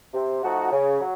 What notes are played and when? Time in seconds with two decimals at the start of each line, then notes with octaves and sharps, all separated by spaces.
0.14 C3
0.43 F3 A3 D#4 F#4
0.72 C#3
1.00 F#3